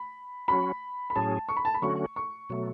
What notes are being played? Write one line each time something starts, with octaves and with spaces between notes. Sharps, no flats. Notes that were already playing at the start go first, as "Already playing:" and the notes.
Already playing: B5
F#3 C#4 F#4 B5
B5
A2 F#3 C#4 G#4 A5
C#6
B5
A5
B5
D3 F#3 A3 C#4 F#4 C#6
C#6
B2 F#3 A3